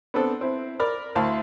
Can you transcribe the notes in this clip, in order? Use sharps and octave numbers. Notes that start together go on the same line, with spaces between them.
B3 C4 D4 A4
C4 E4
A#4 D5 B5 F6
D2 E4 C5 F5 A5 C6